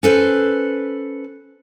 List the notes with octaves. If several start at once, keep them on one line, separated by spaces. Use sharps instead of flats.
C#4 A4 B4 C5